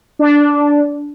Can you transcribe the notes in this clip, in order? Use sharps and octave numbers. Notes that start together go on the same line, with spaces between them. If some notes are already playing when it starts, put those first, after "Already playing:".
D4